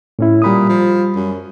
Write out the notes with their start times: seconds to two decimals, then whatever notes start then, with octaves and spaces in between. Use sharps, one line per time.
0.19 A2 C#4 E4
0.42 A#2 G3 B5 D#6
0.69 F3
1.15 F#2